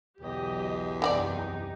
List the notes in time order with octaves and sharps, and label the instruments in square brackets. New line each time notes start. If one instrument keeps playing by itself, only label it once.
[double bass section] B1 D3 F#3 [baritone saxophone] E2 [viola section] G4 D#5
[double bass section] C2 F#2 C3 [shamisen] E3 F#4 D5 [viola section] D#4 G4